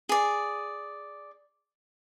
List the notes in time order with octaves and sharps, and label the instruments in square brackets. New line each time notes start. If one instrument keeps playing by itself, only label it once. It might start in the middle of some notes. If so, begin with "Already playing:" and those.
[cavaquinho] G#4 D5